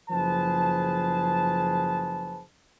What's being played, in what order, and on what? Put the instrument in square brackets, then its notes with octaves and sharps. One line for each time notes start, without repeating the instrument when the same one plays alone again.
[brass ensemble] F#1 F3 G#4 B4 C5 A5